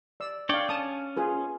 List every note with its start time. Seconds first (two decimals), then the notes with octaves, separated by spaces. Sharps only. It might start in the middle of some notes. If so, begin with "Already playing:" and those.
0.20 D5 E6
0.49 D4 C#5 D5 F5 G5
0.69 C#4 A5 D#6
1.17 F4 G#4 B4